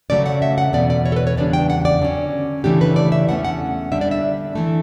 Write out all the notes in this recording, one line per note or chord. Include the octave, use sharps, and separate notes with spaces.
C#3 F#3 A3 C#4 D5
F#5
E5
F#5
E2 B2 A3 D5
D5
C#5
A4
B4
C#5
E2 C#3 G3 D4 D5
G5
F#5
D5
D3 F#3 C#4
C#3 E3 A3 D4 G4
B4
D5
E5
E2 D3 A3 C#4 F#5
F#5
D3 G3 D4 E5
D5
E5
E3 A3